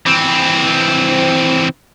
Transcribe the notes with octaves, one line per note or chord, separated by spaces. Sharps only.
E3 C4